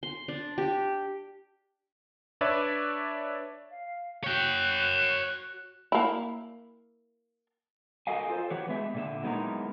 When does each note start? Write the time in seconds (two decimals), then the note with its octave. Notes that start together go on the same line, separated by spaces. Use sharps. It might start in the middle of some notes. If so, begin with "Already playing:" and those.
0.03 C6
0.28 D4
0.58 G4
2.41 D4 B4 C#5 D5 E5
3.70 F5
4.24 F#4 C#5 G5 F#6
5.92 A#3 E4
8.07 F#4 A4 A#4 D#5 F5 G#5
8.30 F4 A4 C5 F5
8.50 E3 F#4 G4 B4 C#5
8.69 G#3 B3 G4 G#4 E5
8.94 A#2 D3 E5
9.23 F#3 G#3 B3 D#4 E4 A#4